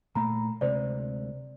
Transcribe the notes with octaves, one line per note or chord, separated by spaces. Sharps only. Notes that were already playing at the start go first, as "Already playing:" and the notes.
A#2 A3 A#3 A#5 B5
D2 C3 G#3 C5 D5